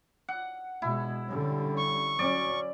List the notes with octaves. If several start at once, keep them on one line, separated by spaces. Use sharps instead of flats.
F#5
B2 G#3 E4
D3 G3 C#4
C#6
F#3 C#4 D5